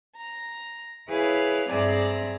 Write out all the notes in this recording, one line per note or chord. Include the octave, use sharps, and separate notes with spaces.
A#5
E4 G#4 B4 C#5 F5
G2 C4 G#4 D5 E5 A#5